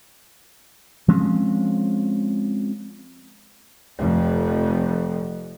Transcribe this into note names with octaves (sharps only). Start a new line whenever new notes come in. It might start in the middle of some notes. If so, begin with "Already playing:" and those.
F3 G#3 C4 C#4
F1 F2